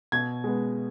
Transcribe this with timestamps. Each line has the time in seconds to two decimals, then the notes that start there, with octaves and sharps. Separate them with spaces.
0.12 B2 G#6
0.44 G#3 B3